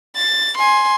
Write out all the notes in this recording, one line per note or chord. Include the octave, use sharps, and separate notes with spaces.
A6
G#5 C6